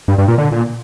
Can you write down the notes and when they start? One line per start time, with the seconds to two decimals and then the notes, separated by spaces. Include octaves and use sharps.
0.08 G2
0.18 G2
0.28 A#2
0.38 D3
0.52 A#2